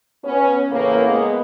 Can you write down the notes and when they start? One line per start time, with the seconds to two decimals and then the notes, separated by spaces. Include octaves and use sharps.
0.24 B3 C#4
0.70 A2 C#3 E3 A#3
1.05 G#3 B3